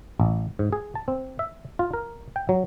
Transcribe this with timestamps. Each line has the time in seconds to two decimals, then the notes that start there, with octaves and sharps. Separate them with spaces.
0.20 A1
0.59 G#2
0.73 G#4
0.95 A5
1.08 C4
1.39 E5
1.79 F4
1.93 A#4
2.36 G5
2.49 F#3